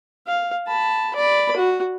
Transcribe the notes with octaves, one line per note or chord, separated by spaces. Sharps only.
F5
A5 B5
D5 B5
F#4